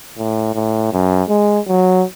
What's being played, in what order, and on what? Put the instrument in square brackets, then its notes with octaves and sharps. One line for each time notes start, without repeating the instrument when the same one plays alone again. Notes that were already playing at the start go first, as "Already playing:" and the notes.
[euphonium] A2
A2
F#2
G#3
F#3